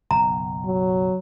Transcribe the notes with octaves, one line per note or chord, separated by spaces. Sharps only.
F#1 B1 A#5
F#3